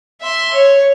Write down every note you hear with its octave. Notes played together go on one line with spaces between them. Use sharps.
E5 C6
C#5